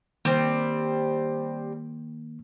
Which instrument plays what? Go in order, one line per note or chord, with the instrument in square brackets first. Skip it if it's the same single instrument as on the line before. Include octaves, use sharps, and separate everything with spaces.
[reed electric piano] D#3 A#3 [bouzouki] G3 C4